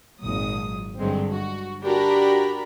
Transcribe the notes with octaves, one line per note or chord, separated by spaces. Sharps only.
G#1 A#2 F#3 D#6
G2 D3 F#3 G#3 C4
F#4
D4 F#4 G4 A#4 A#5 B5